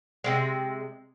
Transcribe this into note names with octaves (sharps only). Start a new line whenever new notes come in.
C3 D#3 G#3